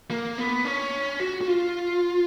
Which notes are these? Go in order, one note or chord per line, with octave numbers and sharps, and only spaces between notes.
A#3
B3
C#4
F#4
F#4
F4